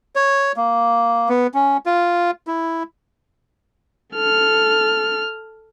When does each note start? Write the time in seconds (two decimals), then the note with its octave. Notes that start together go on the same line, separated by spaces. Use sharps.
0.16 C#5
0.56 A#3
1.29 B3
1.54 C#4
1.86 F4
2.47 E4
4.14 A4 F6